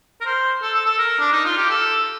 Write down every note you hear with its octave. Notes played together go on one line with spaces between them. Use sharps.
A#4
C5
A4
A4
A4
A#4
D4
D#4
F4
G4
A4